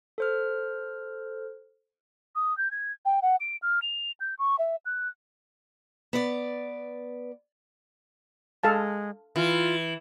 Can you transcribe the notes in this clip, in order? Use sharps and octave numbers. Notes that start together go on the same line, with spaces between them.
A4 C5 F6
D#6
G6
G#6
G5
F#5
D7
F6
F7
G6
C#6
E5
F#6
B3 B4 D5
G#3 A4 F5 A5
E3 F4